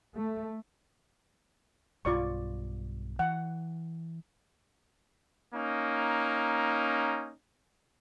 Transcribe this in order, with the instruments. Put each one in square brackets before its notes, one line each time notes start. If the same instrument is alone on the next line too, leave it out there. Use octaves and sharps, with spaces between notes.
[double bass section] A3
[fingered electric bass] B1 G2 [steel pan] F4 D5 C#6
[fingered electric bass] E3 [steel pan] F#5
[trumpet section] A#3 C#4 D#4